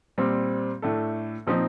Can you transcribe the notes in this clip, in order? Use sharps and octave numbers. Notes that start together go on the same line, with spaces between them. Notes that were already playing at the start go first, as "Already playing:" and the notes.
A#2 G3 C4
A2 A3 D4 A4
A#2 F3 C4 D#4